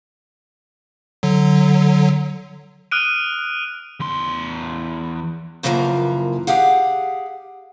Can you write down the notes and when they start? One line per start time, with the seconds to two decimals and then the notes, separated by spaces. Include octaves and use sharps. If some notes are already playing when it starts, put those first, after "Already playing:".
1.23 D3 F#3
2.92 D#6 F6 F#6 D7 D#7
4.00 E2 C6
5.63 F#2 C#3 E3 F3 A#3 A#5
6.47 G4 G#4 F5 F#5